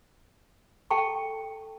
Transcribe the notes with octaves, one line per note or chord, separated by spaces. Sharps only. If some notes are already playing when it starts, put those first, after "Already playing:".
A4 G5 A5 C#6